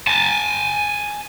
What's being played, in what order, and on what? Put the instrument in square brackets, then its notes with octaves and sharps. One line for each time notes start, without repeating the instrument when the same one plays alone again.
[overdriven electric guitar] G#5 A5